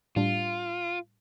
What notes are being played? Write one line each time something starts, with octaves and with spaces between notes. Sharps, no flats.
A2 G3 D4 F4